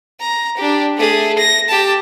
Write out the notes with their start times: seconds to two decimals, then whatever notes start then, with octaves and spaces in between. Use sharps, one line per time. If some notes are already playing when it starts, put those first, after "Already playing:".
0.20 A#5
0.57 D4 G4
0.97 A3 G#4
1.38 A#6
1.68 G4 A5